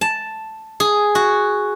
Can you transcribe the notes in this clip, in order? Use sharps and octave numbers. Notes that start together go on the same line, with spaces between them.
A5
G#4
F#4